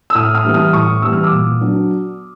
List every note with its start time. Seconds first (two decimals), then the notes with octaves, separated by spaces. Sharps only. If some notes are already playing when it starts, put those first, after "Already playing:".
0.10 E6
0.15 A2 D#6 F6
0.34 D#6 F6
0.45 E3 G3 B3
0.54 D#6 F6
0.73 A2 C#6 D#6
1.02 E3 G3 B3 E6
1.13 F6
1.24 D6 E6
1.31 A#2
1.61 F#3 B3 D4